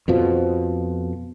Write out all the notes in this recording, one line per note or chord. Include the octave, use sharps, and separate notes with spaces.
F2 B2 F3